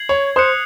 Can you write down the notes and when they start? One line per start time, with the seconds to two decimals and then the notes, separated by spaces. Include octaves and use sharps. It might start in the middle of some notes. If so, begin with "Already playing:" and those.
Already playing: G#6 C7 F#7
0.09 C#5
0.36 C5 D#6 F#6 C#7